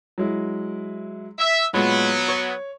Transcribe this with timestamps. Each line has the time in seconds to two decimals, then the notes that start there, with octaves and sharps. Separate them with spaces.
0.18 F#3 G#3 E4
1.38 E5
1.73 A#2 F#3 G#3 B3 B5
2.28 C#5